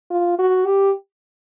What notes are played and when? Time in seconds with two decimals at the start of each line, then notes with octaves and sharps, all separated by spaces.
0.10 F4
0.38 F#4
0.66 G4